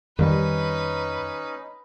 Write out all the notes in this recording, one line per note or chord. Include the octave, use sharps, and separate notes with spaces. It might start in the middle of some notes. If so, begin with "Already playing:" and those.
F2 D#3 G3 C#4 D#4 B4 D#5